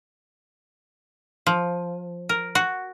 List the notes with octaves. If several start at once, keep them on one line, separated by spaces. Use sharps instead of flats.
F3
A#4
F#4